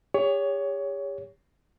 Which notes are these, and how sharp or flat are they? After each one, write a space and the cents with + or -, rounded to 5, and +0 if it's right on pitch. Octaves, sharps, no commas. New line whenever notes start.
G4 +45 C#5 +20